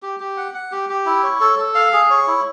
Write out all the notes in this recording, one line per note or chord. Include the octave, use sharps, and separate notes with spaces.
G4
G4
F#5
F#5
G4
G4
E4
C#5
A4
A4
F5
G#4
C#5
E4